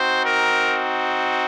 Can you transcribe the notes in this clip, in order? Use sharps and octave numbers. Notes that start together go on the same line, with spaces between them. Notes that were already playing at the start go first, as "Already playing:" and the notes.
Already playing: C4 D#4 F#4 C5
A#4